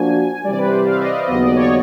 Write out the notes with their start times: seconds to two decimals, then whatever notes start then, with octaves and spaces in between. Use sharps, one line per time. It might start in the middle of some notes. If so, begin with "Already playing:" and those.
Already playing: F3 A#3 D4 F#4 G#5
0.44 C3 E3 G3 D5
0.58 B4
0.66 C5
0.85 F5
0.93 E5
1.00 D#5
1.07 D5
1.28 D#2 C#3 F#3 B3 D#5
1.42 D5
1.56 C#5